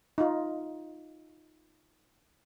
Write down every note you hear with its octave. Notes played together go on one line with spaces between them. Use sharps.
D#4 F4